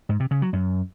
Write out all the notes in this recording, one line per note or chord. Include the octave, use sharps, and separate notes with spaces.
G#2
C3
C#3
F#3
F#2